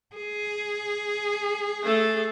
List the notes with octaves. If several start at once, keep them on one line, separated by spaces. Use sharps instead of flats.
G#4
A3 A4